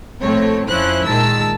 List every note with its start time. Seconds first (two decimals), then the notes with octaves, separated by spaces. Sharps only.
0.22 A#1 A2 A3 C4 C#5
0.69 F2 F3 C#4 E4 C5 F#6
1.07 A#2 D#3 G#3 A5 E6